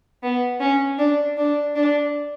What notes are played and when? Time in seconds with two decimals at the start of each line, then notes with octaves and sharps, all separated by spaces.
0.23 B3
0.60 C#4
0.99 D4
1.37 D4
1.75 D4